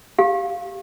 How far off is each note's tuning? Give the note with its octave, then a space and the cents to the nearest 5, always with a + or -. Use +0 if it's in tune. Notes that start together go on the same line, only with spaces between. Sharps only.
G4 -5 F5 +0